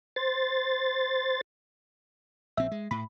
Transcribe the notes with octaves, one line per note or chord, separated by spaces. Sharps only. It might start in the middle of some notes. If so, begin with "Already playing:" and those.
C5 A6
A#1 C4 E5
G#3
A2 B5